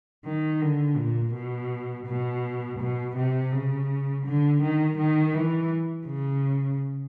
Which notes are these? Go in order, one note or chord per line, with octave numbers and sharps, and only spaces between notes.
D#3
D3
A#2
B2
B2
B2
C3
C#3
D3
D#3
D#3
E3
C#3